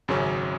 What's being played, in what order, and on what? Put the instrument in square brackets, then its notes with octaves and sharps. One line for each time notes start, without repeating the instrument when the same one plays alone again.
[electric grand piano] G#1 F#2 C#3 F#3 C#4